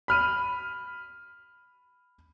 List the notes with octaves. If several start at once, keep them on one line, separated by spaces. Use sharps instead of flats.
B5 F6 D#7